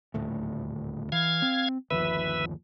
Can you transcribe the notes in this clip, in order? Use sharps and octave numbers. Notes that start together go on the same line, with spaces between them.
D#1 D2 A2
E3 F5 G#6
C4
G1 D#2 F3 B4 E5